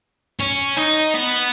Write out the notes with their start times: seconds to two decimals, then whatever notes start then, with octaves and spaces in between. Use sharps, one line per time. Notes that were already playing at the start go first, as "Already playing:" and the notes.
0.40 C#4
0.77 D#4
1.14 B3